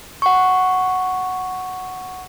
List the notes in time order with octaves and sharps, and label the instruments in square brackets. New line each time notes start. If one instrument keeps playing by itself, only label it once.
[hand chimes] F#5 C#6